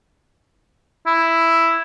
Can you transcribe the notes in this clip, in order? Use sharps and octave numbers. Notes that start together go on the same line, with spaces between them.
E4